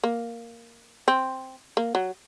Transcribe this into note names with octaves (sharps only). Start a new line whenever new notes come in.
A#3
C4
A#3
F#3